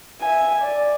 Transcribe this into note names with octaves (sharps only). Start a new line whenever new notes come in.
E5 G#5
D5